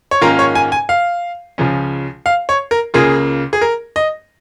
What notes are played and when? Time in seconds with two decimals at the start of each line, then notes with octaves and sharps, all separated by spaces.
0.11 C#5
0.21 G#2 D#3 A#3 C#4 F4 A#4
0.39 C#5
0.55 G#5
0.72 G#5
0.89 F5
1.58 C#2 C#3 F3 C#4
2.26 F5
2.49 C#5
2.71 A#4
2.94 C#2 C#3 A#3 F4 G#4
3.53 G#4
3.61 A#4
3.96 D#5